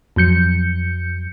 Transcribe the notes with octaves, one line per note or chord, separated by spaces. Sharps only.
F2 F#3 G6 C#7